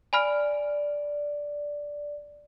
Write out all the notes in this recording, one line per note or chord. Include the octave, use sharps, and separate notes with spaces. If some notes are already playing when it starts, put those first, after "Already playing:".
D5 G#5 B5 F6